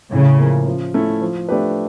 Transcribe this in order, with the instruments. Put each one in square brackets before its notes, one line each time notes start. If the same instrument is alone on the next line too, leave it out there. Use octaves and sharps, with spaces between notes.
[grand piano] A2 [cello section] C#3
[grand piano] F3 A#3
F3
A3 C#4 E4
F3
A3 D4 G4 B4